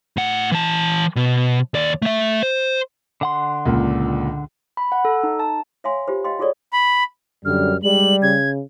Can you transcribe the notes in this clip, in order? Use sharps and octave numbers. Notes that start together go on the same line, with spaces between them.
A2 F#5
E3 A5
B2
D#2 D5
A3 E5
C5
D3 F#5 C6
C#2 A#2
B5
F#5
A4
D#4
A5
C#5 E5 F5 G#5 C6
F4 G4 C5
D#5 F5 G5 C6
F4 F#4 G#4 A4 C#5 D5
B5
F#2 D3 G3 F6
G3 G#3 F#7
C#3 G#6